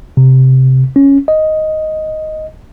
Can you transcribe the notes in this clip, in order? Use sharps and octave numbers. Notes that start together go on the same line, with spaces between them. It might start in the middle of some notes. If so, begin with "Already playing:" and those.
C3
C#4
D#5